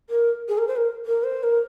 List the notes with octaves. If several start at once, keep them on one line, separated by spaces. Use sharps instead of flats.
A#4
G#4
A#4
C5
A#4
A#4
C5
A#4